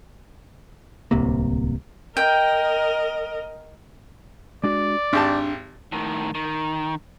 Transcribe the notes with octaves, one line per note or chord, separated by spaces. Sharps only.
D1 C2 C3 A#3
A#4 D#5 G5
G#3 D4 F#4 D5
G#1 D4 G4 A5
A2 D#3
D#3